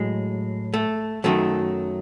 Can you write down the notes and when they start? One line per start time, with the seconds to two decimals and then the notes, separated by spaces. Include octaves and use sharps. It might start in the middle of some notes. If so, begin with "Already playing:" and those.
Already playing: A2 F#3 G#3
0.74 A3
1.24 F#2 D#3 F#3 A3